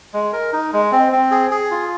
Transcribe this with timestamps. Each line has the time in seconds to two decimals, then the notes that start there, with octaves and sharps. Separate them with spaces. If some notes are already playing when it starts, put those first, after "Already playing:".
0.14 G#3
0.33 A#4
0.53 D#4
0.73 G#3
0.92 C4
1.12 C4
1.31 G#4
1.51 G#4
1.71 F4